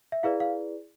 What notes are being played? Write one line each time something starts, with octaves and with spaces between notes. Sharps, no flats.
E5
E4 G#4 B4 D5 F5
F5